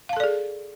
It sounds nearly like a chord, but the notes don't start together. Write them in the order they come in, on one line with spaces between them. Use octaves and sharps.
F5 A5 A4 D5 G#4